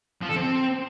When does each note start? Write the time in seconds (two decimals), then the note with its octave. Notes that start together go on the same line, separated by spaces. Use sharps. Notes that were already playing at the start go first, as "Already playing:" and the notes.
0.22 F3
0.29 A4
0.36 C4